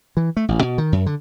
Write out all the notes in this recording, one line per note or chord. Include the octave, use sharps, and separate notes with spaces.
E3
A3
A1
B2
D#3
F#2
D3